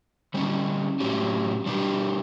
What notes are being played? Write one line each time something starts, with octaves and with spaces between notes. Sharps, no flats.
D3 G3 C#4
A2 F#3 C#4 G4
B2 G3 D4 G4